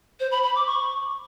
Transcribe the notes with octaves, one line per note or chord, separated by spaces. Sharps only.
C5
B5
B5
D6
C#6